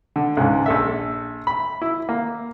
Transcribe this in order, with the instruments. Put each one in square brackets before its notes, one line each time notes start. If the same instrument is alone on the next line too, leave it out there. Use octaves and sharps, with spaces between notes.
[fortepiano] D3
C#2 G#2
A#1 A4 E5
B5
E4
A#3